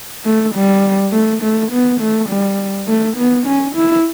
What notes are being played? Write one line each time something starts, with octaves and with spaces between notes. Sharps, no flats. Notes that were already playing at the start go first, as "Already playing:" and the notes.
A3
G3
A3
A3
B3
A3
G3
A3
B3
C#4
E4